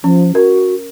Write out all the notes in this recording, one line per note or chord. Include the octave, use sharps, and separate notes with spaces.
F3 C#4
F#4 A#4